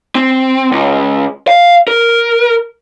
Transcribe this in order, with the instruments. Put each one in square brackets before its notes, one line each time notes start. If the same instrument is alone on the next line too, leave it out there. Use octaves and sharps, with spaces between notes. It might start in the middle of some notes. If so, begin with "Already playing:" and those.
[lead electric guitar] C4
C#2
F5
A#4